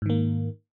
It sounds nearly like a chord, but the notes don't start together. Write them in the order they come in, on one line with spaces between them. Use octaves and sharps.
G#2 D#3 A#3